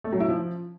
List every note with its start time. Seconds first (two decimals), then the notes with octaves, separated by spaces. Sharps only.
0.04 A3
0.12 F#3
0.20 E4
0.28 F3